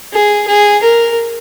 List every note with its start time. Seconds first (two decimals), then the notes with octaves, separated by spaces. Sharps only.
0.13 G#4
0.48 G#4
0.83 A#4